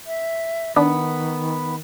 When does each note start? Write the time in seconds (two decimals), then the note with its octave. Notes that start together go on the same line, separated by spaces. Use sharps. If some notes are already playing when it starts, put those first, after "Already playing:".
0.07 E5
0.76 D#3 B3 D4